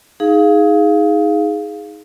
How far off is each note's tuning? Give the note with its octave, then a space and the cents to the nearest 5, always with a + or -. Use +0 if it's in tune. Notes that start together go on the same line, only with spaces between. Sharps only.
D#4 +20 G#4 +0 F5 +0